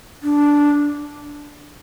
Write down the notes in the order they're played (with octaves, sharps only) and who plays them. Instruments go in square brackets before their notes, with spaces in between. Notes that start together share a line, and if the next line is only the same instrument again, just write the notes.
[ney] D4